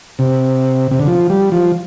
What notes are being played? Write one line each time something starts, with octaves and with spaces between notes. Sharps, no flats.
C3
C3
D3
F3
G3
F3